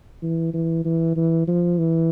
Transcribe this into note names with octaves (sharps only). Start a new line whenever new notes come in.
E3
E3
E3
E3
F3
E3